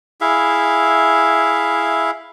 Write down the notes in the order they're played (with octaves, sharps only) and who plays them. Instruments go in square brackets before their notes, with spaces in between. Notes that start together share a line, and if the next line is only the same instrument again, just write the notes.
[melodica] E4 G#4 E5 F5